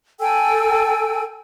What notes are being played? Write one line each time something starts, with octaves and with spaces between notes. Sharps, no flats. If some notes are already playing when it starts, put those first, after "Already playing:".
A4 G5 G#5 E6